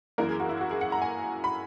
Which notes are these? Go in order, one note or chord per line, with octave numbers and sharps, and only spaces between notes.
F#2 E3 A#3 A#4
G#4
F#4
E4
F#4
G#4
F#5
A#5
G#5
B5